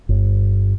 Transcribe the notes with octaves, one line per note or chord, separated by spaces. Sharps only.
G1